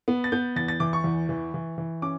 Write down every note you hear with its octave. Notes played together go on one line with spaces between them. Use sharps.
B3
A6
B3 G6
E2 A6
A6
E3 D6
C#6
E2
E3
E3
E3
C#4 D6